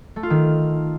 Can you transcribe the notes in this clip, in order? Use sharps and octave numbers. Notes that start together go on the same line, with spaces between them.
A3
F4
D#3